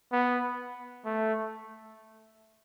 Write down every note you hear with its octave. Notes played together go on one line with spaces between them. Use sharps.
B3
A3